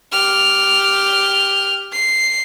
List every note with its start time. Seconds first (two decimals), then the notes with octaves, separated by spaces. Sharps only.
0.12 G4 F6
1.92 C7